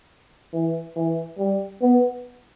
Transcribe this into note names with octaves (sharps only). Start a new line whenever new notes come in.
E3
E3
G3
B3